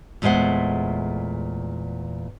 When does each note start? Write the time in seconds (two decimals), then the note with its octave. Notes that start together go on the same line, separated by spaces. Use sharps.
0.22 E2 A#2 G#3 A3 C5 F#5